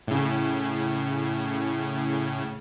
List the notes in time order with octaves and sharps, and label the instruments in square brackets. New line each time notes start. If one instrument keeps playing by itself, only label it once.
[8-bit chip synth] A2 C#3